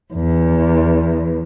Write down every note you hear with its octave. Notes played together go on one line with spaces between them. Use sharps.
E2